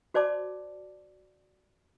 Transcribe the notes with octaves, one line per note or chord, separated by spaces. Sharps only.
F#4 C5 D5 A5 D6